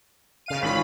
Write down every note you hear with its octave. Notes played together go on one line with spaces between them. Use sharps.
C#3 F5 D#7
G#1 D#3 F3 C#4 B5 B6